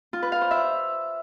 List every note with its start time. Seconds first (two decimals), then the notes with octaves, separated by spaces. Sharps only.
0.13 F4
0.23 B4
0.32 F5
0.41 C5
0.51 E5